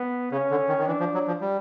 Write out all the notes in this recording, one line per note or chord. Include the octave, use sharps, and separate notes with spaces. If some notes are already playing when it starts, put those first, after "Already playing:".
Already playing: B3
C#3 C#4
D3
D#3
D#3
E3 D4
F3
F#3
F3
G3